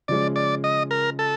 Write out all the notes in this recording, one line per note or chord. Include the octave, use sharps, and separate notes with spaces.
C#3 F3 G#3 D5
D5
D#5
A#4
A4